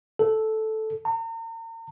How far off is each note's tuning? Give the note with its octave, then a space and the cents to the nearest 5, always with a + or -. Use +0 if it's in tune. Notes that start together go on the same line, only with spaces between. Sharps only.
A4 -5
A#5 -40